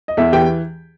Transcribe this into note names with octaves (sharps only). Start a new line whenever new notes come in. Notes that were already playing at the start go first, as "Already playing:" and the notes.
D#5
E2 E4 E5
E3 G4 G5